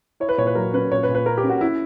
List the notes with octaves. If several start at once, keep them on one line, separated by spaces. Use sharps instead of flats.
E4 C#5
B4
A#2 C#5
B4
F#3 A#4
C#4 B4
A#2 C#5
B4
A#2
B4
A#3 A#4
G4
C#4
F#4
C#4 E4